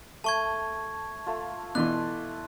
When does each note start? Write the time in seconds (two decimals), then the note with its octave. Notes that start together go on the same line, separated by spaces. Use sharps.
0.24 A3 A5 C#6 G#6
1.26 A3 F4
1.75 B2 E3 D5 C6 F#6